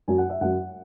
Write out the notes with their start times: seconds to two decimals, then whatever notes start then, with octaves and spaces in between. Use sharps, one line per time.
0.08 F#2 F#3 G#5
0.18 F#5
0.30 E5
0.41 F#2 F#3 F#5